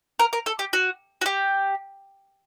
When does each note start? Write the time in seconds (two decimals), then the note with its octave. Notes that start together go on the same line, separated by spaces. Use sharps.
0.19 A#4
0.33 A#4
0.46 A4
0.59 G4
0.73 F#4
1.21 F#4
1.26 G4